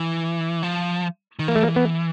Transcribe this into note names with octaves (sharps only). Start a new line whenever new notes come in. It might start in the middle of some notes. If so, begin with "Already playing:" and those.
Already playing: E3
F3
D#3
E3 A#3
A3
A#3
B3